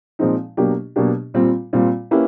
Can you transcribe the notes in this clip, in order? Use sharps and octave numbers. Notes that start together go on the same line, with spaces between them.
A#2 F3 G#3 C4 D#4
B2 F#3 A#3 D4 G4
B2 F#3 A#3 D4 G4
A#2 G3 C4 F4
A#2 G3 C4 F4
A#3 C#4 E4 G4 B4